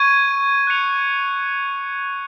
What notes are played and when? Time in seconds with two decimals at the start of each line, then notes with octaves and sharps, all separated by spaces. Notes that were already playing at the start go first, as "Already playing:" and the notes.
Already playing: C#6 G#6 D#7
0.67 F#6 C#7 F7